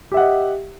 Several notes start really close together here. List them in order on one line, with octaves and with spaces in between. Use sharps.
G4 E5 F#5 D#5